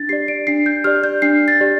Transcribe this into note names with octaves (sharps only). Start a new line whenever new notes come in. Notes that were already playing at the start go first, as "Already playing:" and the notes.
Already playing: D4 A6
G4 D5 C7
D7
D4 C7
G6
G4 D5 F6
G6
D4 C7
A6
G4 D5